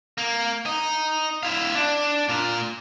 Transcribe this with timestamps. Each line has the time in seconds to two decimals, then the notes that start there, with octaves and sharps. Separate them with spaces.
0.18 A#3
0.66 D#4
1.43 E4 F5
1.75 D4
2.29 A#2 A#4